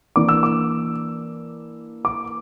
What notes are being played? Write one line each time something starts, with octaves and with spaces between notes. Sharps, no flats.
E3 A#3 D4 D6
E6
D6
D6